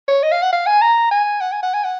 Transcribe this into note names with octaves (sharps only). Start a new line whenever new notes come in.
C#5
D#5
F5
F#5
F5
G#5
A#5
G#5
F#5
G#5
F#5
G#5
F#5